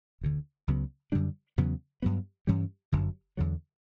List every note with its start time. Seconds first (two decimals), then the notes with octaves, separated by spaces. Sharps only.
0.21 E1 D2 D3
0.67 C#2 C#3 F#3 B3
1.12 F#2 D3 G3 D4
1.58 E2 C#3 F#3 B3
2.02 G2 F#3 B3
2.47 G2 E3 G3 C#4
2.92 G1 F#2 D3 F#3
3.37 E2 D3 F#3